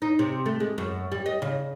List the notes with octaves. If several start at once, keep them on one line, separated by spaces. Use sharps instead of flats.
D#4
C3
A3
G#3
F#2
G3
D#5
C#3